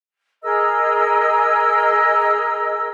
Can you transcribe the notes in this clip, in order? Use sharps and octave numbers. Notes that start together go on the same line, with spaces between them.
G#4 A#4 D#5 E6